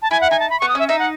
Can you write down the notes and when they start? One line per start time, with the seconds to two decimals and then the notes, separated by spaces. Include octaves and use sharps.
0.02 A5
0.11 E4 G#5
0.21 F#5
0.31 D#4 G#5
0.40 A5
0.50 B5
0.60 B3 C#6
0.69 D#6
0.75 C#4 E5
0.88 D#4 E5
0.99 F#5